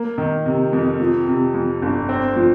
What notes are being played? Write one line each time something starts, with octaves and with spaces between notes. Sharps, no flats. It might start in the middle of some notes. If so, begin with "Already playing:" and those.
Already playing: A#3
D#3
C3
F2
F3
C3
F2
G1
C4
F3